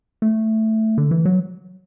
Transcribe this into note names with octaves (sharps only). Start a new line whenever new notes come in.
A3
D3
E3
F#3